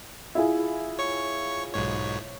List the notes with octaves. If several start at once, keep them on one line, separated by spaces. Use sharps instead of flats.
E4 F4 G#4
C#5 C#6
B1 G#2 C#5